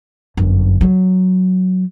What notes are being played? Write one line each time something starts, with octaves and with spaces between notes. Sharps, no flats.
G1 F#2
F#3